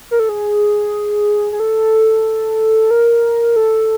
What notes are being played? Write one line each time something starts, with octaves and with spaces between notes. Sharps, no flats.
A#4
A4
G#4
G#4
A4
A#4
A4